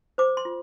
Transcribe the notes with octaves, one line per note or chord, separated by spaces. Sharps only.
C5 D6
C6
F4